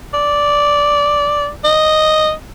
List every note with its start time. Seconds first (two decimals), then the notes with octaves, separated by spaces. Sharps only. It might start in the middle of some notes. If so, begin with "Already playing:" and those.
0.14 D5
1.64 D#5